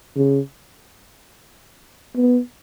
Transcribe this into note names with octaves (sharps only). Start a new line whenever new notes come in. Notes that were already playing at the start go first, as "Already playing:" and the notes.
C#3
B3